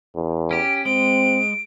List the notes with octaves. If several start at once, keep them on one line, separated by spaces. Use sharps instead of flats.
E2
C#4 G4 D7
G#3 C4 D7